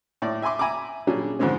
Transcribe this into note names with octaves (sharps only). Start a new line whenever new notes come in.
A2 D5
E5 G#5 B5 C6 D6
E5 G#5 A#5 B5 D6
A#2 F#3 G3 C#4 D4 G#4
F2 G#2 D3 G#3 C4 C#4